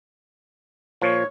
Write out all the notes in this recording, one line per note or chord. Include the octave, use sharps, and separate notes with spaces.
A#2 F3 C#5